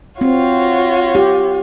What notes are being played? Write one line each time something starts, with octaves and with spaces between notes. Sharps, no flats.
C4 F4 F#4 C#5
G4